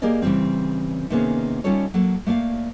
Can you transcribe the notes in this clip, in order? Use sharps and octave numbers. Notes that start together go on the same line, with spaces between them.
A#3 G4 G#4 A#4 D5 D#5
C#3 E3 F#3 G3 C4
C3 D#3 A#3 B3 C#4 G#4
G3 C#4 D#4 F4 A4 C#5
F#3 A#3 A4
A3 A#3 D5 F5